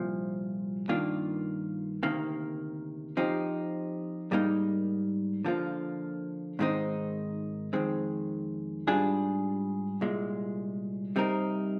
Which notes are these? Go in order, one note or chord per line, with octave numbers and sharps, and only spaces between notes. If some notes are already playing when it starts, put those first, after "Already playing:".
Already playing: C2 A#2 F3
G2 D#3 A#3 D4 F4
D2 C3 D#3 A#3
F3 C4 D#4 G4
G#2 G3 A#3 D#4
D3 F3 A#3 F4
G#2 D#3 G#3 C4 D#4
F2 D#3 G#3 C4
G#2 G3 D4 F4 G#4
C2 A#2 G#3
C3 G3 C4 D#4 A#4